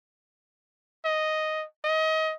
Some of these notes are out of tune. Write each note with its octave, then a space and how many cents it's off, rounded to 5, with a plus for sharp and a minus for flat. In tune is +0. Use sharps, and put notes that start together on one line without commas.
D#5 +0
D#5 +25